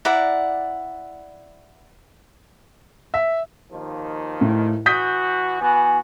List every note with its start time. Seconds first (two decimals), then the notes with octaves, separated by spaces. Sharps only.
0.05 E4 D5 F#5 A#5
3.14 E5
3.71 D#2 D#3 F3
4.41 A2
4.86 E3 F#4 D#6 G6 B6
5.61 E3 B3 F#4 G#5